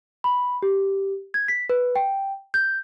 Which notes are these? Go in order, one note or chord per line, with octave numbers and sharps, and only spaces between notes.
B5
G4
G#6
B6
B4
G5
G6